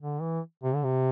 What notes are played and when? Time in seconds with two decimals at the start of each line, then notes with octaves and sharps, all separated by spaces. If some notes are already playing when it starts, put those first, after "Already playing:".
0.01 D3
0.21 E3
0.64 C3
0.75 D3
0.84 C3